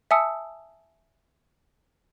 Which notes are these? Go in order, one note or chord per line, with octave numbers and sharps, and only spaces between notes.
E5 G#5 A5 D#6 E6 C#7